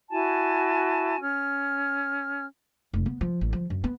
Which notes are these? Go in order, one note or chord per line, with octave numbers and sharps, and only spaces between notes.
E4 F#4 G#5 A5
C#4 F6
F1
B3
F3
A1
F3
F#2
B3